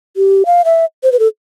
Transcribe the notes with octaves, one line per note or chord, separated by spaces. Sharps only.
G4
F5
E5
C5
B4
A4